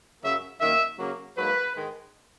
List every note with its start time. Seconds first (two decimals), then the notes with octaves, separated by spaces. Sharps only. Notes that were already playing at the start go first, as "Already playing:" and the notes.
0.22 F#2 C#3 F#3 A#3 E5
0.60 F#2 D#3 A#3 E5
0.98 C#3 F#3 A#3
1.36 G#2 F#3 A#3 B4
1.75 G#2 D#3 G#3